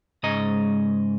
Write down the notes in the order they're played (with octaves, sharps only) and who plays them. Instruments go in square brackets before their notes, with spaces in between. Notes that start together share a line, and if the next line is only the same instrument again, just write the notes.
[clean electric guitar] G#2 C#3 G#3 D#5 A#5